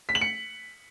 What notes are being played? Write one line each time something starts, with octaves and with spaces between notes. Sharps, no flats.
B6
F#7
C#7